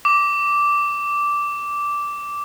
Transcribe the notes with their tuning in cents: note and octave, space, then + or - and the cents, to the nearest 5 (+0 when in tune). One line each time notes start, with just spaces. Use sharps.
D6 -10